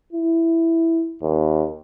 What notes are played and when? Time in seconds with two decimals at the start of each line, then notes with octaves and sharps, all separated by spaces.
0.13 E4
1.22 D#2